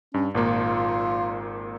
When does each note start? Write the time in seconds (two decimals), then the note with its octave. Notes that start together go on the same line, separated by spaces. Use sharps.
0.14 G2 C#4
0.35 G#1 A#2 A#3 F4